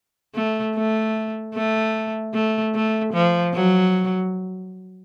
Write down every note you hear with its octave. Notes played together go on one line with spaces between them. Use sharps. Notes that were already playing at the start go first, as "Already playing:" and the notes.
A3
A3
A3
A3
A3
F3
F#3